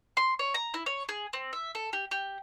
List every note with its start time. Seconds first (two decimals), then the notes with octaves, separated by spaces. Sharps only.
0.17 C6
0.39 C#5
0.54 A#5
0.74 E4
0.86 C#5
1.09 G#4
1.33 C4
1.53 E5
1.75 A4
1.93 G4
2.11 G4